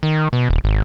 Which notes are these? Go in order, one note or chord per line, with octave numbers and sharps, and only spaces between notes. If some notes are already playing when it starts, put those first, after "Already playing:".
D#3
B2
D#1
G#1